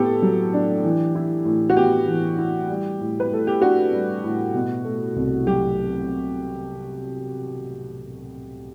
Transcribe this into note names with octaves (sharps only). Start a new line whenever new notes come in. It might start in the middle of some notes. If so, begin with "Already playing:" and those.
Already playing: A2 B3 G4 A4
F#3
D4
E3
E4
A2
F#4
B3 G4
E3
E4
G3
A2
B4
A2 A4
G4
D4 F#4
G3
A2
B2
A3
C2
F#3 G4